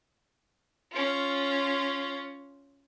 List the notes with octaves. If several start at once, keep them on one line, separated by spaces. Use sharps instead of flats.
C#4 F4